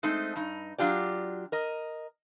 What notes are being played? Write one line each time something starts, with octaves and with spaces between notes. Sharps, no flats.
G#3 A3 C4 D#4
G2 D#4
F#3 D4 F4 G4 D5
A#4 D#5